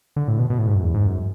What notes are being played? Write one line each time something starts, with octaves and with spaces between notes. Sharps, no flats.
D3
A2
B2
B2
A2
G#2
F#2
E2
G#2
F#2